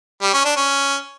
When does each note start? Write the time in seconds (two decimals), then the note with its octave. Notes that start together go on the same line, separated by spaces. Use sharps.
0.22 G3
0.33 C#4
0.45 D4
0.56 C#4